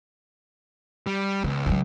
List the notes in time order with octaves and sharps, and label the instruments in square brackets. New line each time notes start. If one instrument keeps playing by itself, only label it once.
[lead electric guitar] G3
[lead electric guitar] C#2 [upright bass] B3
[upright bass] D#3 F#3